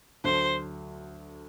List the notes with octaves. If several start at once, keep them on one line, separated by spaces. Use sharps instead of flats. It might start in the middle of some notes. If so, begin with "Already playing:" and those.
D2 D3 F#3 C5